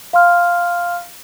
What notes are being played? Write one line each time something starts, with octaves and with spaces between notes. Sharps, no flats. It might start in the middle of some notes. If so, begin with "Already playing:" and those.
F5 C6 F6